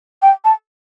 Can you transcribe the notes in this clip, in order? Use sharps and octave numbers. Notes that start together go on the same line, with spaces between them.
G5
A5